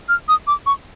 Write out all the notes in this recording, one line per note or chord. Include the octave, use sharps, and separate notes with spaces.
F6
D#6
D6
C#6